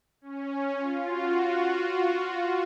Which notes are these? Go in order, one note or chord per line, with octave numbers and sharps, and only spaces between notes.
C#4
C#4
F4
F#4